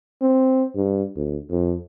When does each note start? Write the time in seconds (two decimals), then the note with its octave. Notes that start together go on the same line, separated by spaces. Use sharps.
0.22 C4
0.76 G2
1.16 D2
1.50 F2